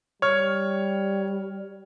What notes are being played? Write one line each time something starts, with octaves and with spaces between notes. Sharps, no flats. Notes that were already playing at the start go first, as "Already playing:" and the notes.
G3 C#5 F6